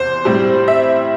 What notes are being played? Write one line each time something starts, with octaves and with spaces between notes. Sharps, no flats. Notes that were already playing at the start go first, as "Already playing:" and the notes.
Already playing: E2 C3 C5
A2 G3 C4
E5